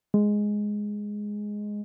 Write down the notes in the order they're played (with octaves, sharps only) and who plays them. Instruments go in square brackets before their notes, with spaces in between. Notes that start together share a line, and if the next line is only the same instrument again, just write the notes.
[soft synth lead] G#3